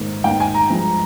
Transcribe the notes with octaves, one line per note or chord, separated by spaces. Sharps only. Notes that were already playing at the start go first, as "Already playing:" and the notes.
Already playing: G#2 D#3 A#3
G#2 D#3 A#3 G5
G#5
A#5
G2 F3 G#3